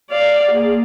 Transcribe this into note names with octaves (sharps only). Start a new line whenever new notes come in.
D5 F5
A#3 G#4